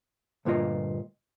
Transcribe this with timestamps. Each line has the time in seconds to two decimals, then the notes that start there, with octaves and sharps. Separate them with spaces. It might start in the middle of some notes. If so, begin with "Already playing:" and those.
0.45 D2 G2 A#2 F4 D#5